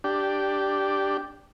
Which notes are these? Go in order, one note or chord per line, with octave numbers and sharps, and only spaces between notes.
D4 G4